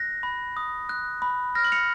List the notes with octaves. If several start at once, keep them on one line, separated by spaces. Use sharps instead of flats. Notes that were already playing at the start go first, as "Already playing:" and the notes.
Already playing: F#6 A#6
B5
D#6
F#6
B5
F6 A#6
F#7
C#7 F7